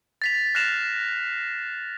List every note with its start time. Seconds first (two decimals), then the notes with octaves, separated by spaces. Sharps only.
0.22 A6 B6 F7
0.55 F6 F#6 A#6 C7 E7 F7